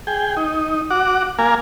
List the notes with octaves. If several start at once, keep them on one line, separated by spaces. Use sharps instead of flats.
G#4 G5
D#4
F#4 F#5 D6
A#3 A#4 F5 G#5